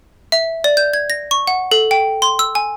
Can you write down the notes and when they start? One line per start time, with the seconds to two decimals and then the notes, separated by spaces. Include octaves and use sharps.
0.32 E5
0.64 D5
0.77 G6
0.94 G#6
1.10 A#6
1.31 C#6
1.47 F#5
1.71 A4
1.91 G5
2.22 C6
2.39 E6
2.55 G#5